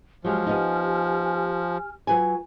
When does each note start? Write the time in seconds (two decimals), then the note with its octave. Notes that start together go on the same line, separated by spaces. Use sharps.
0.25 F3 F#3 G#3 G4 G#5 F6
0.46 B3 D#4
2.07 F#3 F4 B4 G#5